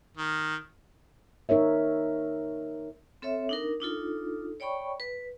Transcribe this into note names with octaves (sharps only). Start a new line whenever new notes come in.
D#3
D#4 A#4 C#5 E5
C4 A4 C#5 E5
D4 D#4 A#4
D4 D#4 F4 A4
C#5 D5 G5 B5 C#6
B4